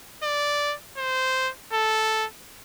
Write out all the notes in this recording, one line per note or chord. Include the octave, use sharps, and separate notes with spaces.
D5
C5
A4